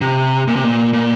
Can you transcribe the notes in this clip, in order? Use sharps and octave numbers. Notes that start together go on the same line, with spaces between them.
C3
A#2
C3
A#2
A#2